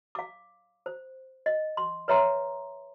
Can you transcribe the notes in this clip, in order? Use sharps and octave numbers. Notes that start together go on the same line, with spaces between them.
F5 D6
C5
D#5
C6
B4 C#5 E5 A#5 C6